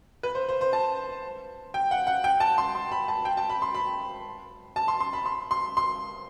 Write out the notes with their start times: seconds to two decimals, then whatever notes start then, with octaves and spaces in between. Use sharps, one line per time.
0.23 B4
0.35 C5
0.49 C5
0.61 C5
0.73 A5
1.74 G5
1.91 F#5
2.07 F#5
2.24 G5
2.40 A5
2.58 C6
2.75 C6
2.92 B5
3.08 A5
3.25 G5
3.37 A5
3.50 B5
3.62 C6
3.75 B5
4.76 A5
4.88 C6
5.00 C6
5.13 B5
5.26 C6
5.51 C6
5.77 C6